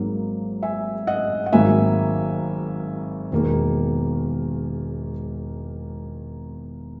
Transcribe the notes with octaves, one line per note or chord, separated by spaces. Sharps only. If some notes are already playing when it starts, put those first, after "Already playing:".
Already playing: G#1 G#2 F#3 A#3 D#4
E5 G#5
D#5 F#5
F#5
G#1 G#2 D#3 F#3 A#3 E5 G#5
E1 E2 D#3 A#3